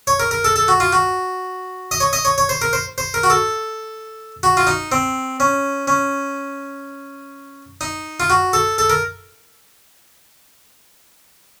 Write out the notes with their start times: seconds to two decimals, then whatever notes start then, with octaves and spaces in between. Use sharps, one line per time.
0.07 C#5
0.20 A#4
0.31 A#4
0.45 A4
0.56 A4
0.68 F#4
0.80 F4
0.93 F#4
1.91 D#5
2.00 C#5
2.13 D#5
2.25 C#5
2.38 C#5
2.49 C5
2.62 A#4
2.73 C5
2.98 C5
3.14 A#4
3.23 F#4
3.30 A4
4.43 F#4
4.57 F4
4.67 D#4
4.92 C4
5.40 C#4
5.88 C#4
7.81 D#4
8.20 F4
8.30 F#4
8.53 A4
8.78 A4
8.90 A#4